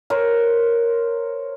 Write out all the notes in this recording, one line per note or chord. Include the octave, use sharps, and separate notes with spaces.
A#4 C5 C#5